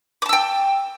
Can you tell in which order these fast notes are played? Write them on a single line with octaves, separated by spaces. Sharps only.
D6 A5 E6 G5